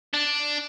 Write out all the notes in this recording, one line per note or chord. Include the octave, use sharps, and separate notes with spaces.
D4